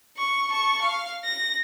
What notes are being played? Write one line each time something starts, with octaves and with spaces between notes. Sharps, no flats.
C#6
A5 C#6
F5
A#6